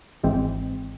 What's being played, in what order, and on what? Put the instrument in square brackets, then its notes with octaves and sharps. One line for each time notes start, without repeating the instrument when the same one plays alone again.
[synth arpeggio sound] G#1 G#2 E3 G#3 C4